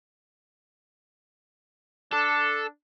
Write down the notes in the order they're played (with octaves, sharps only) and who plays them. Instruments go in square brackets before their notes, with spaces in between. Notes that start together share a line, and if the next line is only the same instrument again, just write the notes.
[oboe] D4 [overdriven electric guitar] A4